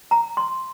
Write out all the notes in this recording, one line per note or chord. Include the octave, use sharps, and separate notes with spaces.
A#5
C6